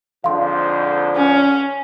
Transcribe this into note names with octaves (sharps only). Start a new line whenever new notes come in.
F2 G#2 D3 F5 C6
C#4